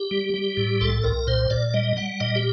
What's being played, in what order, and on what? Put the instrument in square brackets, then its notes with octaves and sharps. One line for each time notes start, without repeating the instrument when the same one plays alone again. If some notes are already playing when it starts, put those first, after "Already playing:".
Already playing: [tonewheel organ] G4
G3
G3
A2
C2 A4
C2 A#4
A#2 C5
A#2 D5
G3 D#5
G3 F#5
A#2 D#5
G4